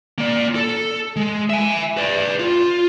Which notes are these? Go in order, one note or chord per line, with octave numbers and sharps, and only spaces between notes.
A#3 D5
A4
G#3
E5 G#5
B4 D5
F4